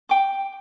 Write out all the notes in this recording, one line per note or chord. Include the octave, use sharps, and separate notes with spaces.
G5 D6